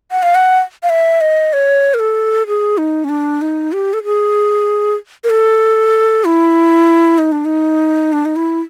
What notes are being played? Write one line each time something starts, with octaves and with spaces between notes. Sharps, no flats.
F#5
F5
F#5
F5
E5
D#5
C#5
A#4
A4
G#4
D#4
C#4
D4
D#4
G4
A4
G#4
A#4
A4
E4
D#4
D4
D#4
D4
D#4
E4